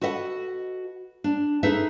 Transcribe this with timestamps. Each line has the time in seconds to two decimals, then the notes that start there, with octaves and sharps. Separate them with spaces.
0.01 F#4 A4 B4 D#5 F#5
1.24 D4
1.63 D#4 G#4 A4 B4 E5